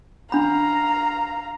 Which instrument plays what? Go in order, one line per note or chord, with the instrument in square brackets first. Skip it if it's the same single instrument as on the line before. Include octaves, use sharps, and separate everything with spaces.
[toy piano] D4 B5 [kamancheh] F5 A#5